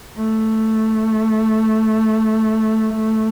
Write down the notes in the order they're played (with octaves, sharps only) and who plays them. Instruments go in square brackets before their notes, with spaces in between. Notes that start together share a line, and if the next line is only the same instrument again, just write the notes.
[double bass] A3